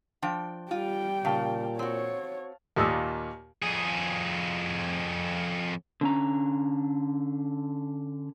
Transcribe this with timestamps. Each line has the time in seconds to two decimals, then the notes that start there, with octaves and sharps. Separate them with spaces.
0.22 F3 D4 G5
0.71 G3 F4 G5
1.25 A#2 C#3 F5 A5
1.79 C4 F#4 C#5
2.76 D#2 A#2 D#6 E6
3.63 F2 G#4
6.01 D3 C#4 A#5